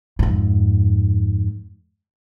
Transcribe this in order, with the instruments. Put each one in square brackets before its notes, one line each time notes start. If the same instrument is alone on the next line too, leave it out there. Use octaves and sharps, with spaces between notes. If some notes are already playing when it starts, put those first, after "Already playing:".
[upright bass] F2 G#2